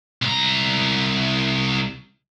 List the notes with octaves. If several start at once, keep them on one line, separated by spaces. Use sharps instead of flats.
C2 A#5